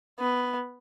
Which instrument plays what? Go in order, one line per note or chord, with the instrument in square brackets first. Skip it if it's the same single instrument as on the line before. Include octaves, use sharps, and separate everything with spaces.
[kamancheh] B3